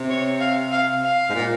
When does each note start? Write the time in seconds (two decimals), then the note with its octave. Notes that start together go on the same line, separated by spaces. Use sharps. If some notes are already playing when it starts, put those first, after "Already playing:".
Already playing: C3
0.10 C#5
0.40 F5
0.72 F5
1.03 F5
1.30 G#2
1.34 A#2